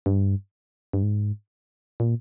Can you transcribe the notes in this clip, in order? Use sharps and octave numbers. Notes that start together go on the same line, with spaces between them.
G2
G2
G#2
A#2